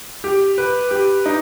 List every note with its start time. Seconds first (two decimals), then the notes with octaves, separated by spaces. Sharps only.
0.24 G4
0.58 B4
0.91 G4
1.26 D#4